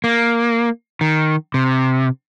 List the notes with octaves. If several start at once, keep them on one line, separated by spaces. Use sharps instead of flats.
A#3
D#3
C3